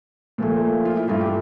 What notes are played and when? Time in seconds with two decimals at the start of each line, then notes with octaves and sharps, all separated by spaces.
0.38 A#2 F3 A3
0.85 F4
0.97 E4
1.09 G2 E3 A3 F4
1.20 G4